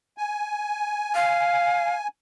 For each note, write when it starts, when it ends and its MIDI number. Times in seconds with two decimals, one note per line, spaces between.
0.18 2.08 80
1.15 1.93 77